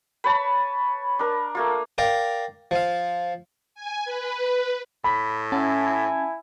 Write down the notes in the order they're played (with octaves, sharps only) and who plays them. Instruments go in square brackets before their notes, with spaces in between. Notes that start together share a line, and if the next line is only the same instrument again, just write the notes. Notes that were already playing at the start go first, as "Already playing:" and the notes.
[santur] B4 C#5 A5 [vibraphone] B5
[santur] D4 A#4
A3 A#3 F4
[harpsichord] A#4 D5 F5 G5
F3 F5
[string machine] G#5
B4
[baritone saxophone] A2 [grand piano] B5
[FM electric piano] C#4 F#5 A5 [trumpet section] E4 G#5